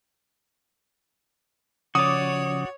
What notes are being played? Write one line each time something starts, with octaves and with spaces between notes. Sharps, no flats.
C#3 F3 C#4 F#4 C#5 D5 D6 D#6